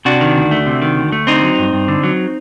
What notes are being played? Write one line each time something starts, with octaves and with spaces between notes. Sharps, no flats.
C3 D4 F#4
D#3
D2
A3
C3
D#3
D2
A3
D3 C4 D#4
F#3
G2
G2
D3
F#3